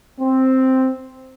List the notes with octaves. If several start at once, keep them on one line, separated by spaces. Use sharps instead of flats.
C4